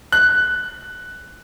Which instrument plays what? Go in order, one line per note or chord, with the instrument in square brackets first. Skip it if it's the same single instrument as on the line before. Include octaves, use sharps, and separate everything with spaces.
[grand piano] F#6